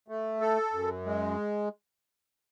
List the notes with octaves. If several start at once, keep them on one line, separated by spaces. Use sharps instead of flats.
A3
A4
F#2
G#3